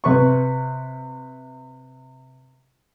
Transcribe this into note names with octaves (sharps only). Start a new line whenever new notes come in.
C3 B4 C#6